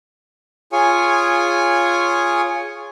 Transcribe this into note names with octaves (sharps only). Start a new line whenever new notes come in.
F4 G#4 C#5 G#5